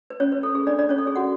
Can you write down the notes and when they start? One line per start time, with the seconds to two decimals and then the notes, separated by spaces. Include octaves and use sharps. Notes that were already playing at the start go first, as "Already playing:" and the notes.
0.10 B4
0.20 C#4 C#5
0.32 B4
0.43 A4
0.55 G#4
0.67 D4 D5
0.79 D4 D5
0.89 C#4 C#5
0.98 A4
1.07 G#4
1.15 F#4 F#5